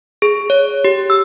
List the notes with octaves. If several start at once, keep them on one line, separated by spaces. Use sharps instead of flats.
G#4
C#5
G4
E6